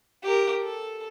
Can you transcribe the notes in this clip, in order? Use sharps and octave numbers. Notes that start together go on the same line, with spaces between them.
G4 A#4
A4